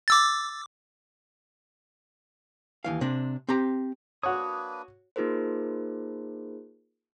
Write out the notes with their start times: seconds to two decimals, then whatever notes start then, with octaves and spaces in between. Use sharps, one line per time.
0.08 D6 E6 A6
2.84 D#2 E3 F5
3.01 C3 C4 D4
3.49 C4 G4 A#5
4.23 A#3 D4 F#4 B4 C#5 D#6
5.16 A#3 D#4 F4 G#4 A#4 C5